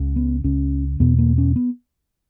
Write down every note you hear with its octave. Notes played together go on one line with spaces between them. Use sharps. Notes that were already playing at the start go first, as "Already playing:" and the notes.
Already playing: C#2 C#3
B3
C#2 C#3 C#4
E2 B2 B3
A#3
C#4
B3